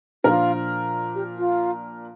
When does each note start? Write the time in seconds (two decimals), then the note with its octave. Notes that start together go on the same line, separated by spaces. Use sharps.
0.24 A#2 F3 D4 F4 A#4
1.15 G4
1.37 F4